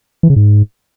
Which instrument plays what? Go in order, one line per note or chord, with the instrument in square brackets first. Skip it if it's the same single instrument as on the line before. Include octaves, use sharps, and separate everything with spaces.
[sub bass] E3
C#3
G#2